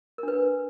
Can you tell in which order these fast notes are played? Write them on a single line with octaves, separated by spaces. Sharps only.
A#4 D4 B4